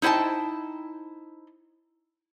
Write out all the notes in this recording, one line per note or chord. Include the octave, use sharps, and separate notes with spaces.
D#4 E4 C5 G5 A5